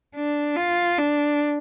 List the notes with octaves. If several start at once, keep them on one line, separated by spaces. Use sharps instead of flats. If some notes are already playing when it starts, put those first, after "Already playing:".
D4
F4
D4